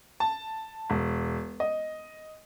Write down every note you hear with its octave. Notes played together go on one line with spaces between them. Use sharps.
A5
E1
D#5